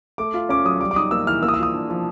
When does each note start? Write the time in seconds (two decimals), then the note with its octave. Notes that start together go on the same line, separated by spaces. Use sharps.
0.18 A3 D6
0.34 F4
0.49 C#4 D6
0.65 F#3 D#6
0.81 G3 D6
0.91 D6
0.96 D#4 D#6
1.11 A#3 E6
1.27 E3 F6
1.43 A#3 E6
1.49 D#6
1.54 E6
1.59 F4 D#6
1.74 D4
1.90 F3